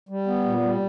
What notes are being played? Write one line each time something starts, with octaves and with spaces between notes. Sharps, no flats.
G3
B3
A#2
G3